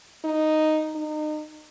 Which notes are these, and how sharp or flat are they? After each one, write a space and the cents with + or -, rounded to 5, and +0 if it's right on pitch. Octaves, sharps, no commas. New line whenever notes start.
D#4 -5
D#4 -30